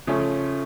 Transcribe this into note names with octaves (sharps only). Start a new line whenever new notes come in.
C#3 F3 A3 C#4